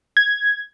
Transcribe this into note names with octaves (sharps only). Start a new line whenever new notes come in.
G#6